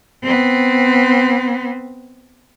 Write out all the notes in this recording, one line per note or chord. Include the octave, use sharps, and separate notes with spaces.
B3 C4